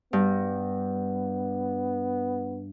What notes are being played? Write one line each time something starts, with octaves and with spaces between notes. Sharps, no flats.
G2 B3